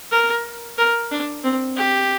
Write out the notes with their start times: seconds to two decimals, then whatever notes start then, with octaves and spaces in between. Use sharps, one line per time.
0.11 A#4
0.78 A#4
1.11 D4
1.44 C4
1.77 G4